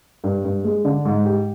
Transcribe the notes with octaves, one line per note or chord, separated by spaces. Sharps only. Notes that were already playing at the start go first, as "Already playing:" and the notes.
G2
G2
G#3
D3
G#2
G4